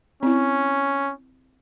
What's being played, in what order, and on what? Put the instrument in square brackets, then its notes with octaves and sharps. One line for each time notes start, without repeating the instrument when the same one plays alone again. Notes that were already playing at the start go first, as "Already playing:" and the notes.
[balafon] C4 E4 [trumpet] C#4